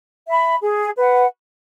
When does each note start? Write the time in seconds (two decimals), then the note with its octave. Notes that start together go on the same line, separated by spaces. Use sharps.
0.27 E5 B5
0.61 G#4
0.96 B4 F#5